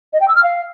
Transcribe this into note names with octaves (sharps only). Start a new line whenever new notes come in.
D#5
G5
E6
F6
F5